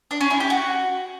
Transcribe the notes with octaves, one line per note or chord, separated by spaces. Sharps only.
D4
C#4
E4
G4
F#4